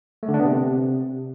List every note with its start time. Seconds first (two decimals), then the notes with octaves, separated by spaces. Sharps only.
0.23 A3
0.28 D3
0.34 D4
0.40 B3
0.45 C3